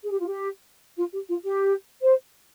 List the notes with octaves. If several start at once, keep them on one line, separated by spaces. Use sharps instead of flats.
G#4
G4
F4
G4
F4
G4
F4
G4
C5